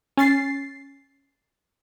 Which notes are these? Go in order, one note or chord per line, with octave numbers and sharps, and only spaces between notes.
C#4 A6 C7